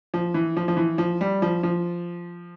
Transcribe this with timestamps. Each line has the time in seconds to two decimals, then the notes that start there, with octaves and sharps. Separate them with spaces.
0.14 F3
0.34 E3
0.57 F3
0.68 F3
0.77 E3
0.98 F3
1.21 G3
1.42 F3
1.63 F3